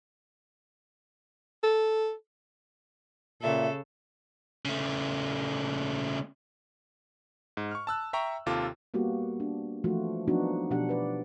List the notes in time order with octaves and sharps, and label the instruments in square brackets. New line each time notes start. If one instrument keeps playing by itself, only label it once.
[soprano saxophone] A4
[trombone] A#2 [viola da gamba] C#3 A4 [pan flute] E5
[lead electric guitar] C#3 A3
[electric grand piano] G#2
C#6 F6
A5 E6 F#6
E5 G5 A#5 C#6
D#2 C3 F4 A4 D6
[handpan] G3 A#3 B3 F#4 G4
D4
E3 F3 A3 F4 F#4
F3 F#3 B3 D4 D#4 F#4
B2 F3 D4 G4 F#5
B4 D5